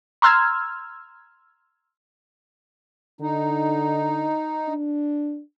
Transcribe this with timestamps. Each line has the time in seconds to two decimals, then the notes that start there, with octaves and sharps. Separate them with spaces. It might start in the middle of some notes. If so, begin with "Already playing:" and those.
0.22 A#5 C6 E6 F6 G#6
3.21 D3 D#4
4.68 D4